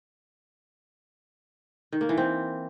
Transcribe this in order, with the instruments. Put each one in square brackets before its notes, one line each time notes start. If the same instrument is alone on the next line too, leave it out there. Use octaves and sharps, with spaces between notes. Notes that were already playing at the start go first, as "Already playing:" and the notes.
[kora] D#3
A#3
E3
C4